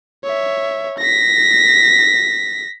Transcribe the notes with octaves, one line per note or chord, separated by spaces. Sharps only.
C#5 E5
A#6 B6